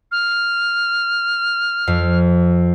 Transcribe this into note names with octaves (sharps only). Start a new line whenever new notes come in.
F6
F2